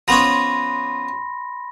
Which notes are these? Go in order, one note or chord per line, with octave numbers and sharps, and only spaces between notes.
F3 B3 C#4 B5 C6 A#6